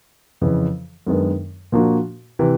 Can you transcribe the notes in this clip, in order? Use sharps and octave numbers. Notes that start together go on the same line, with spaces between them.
F2 C#3 E3
F#2 D#3 G#3 B3 D4
A#2 F3 A#3 D4 F#4
C3 E3